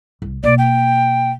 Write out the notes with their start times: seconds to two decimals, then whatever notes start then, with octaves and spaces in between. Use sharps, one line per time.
0.22 C2
0.44 B2 A#3 D5
0.58 G5